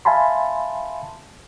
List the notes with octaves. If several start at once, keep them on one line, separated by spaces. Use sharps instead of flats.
E5 F5 G#5 A5 B5 C6